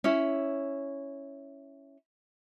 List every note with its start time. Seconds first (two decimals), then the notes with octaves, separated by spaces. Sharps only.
0.04 C#4 E4